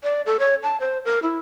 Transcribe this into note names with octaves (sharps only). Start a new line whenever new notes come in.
D5
A4
C#5
A5
C5
A#4
E4